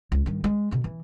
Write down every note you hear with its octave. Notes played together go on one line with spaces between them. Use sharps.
C#2
G2 D#3
G#3
B2 D3
E3